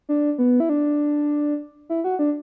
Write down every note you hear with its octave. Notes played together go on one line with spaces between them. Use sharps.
D4
B3
E4
D4
E4
F#4
D4